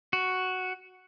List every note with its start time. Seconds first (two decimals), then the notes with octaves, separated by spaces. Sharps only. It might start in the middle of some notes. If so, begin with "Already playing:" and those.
0.13 F#4